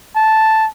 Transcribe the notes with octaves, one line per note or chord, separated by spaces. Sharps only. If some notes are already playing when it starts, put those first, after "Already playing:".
A5